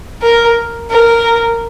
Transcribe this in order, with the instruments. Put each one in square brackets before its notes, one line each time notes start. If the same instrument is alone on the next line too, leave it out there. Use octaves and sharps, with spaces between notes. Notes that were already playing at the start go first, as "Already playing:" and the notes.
[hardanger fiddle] A#4
A#4